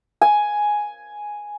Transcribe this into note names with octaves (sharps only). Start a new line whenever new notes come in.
G#5